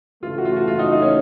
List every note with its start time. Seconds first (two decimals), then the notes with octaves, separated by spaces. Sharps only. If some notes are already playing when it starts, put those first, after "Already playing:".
0.23 C#3 E3 A3 F4
0.38 F#4
0.45 F4
0.56 F#4
0.68 F4
0.79 D#4
0.92 D#4
1.02 C#4